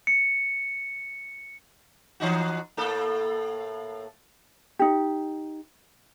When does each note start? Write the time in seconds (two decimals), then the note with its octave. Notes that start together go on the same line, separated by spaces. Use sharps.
0.07 C#7
2.20 E3 D#4 F#4
2.77 A2 A#3 A4
4.79 D#4 G4